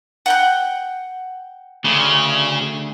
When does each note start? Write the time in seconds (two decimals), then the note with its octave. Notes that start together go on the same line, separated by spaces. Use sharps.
0.26 F#5 G5 F#6
1.85 D2 C#3